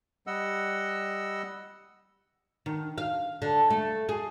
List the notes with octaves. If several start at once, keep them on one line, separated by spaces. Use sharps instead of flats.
G3 D#5 F#5 E6
D#3
F5
D3
A3
G#4